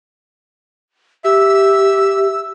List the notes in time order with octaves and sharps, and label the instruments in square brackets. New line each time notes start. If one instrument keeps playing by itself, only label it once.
[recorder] G4 [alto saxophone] E5 [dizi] E6